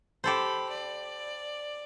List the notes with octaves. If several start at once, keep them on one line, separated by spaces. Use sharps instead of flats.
G4 A4 C5 B5
D5